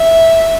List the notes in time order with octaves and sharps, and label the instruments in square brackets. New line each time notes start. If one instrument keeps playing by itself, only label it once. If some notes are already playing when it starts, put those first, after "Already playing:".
Already playing: [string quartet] E5